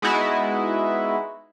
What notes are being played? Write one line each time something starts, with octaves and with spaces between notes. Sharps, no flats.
G#3 B3 D#4 E4 F#4